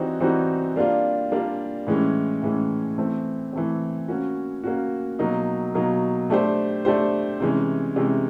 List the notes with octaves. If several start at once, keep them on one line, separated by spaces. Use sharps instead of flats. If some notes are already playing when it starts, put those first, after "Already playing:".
Already playing: E3 G3 C4 D#4 F#4
E3 G3 C4 D#4 F#4
G3 A#3 D4 F4
G3 A#3 D4 F4
A2 E3 G#3 C#4
A2 E3 G#3 C#4
E3 A3 C4
E3 A3 C4
A#3 C#4 F#4
A#3 C#4 F#4
B2 F#3 A#3 D#4
B2 F#3 A#3 D#4
A3 D4 G4 C5
A3 D4 G4 C5
C3 E3 G#3 C#4
C3 E3 G#3 C#4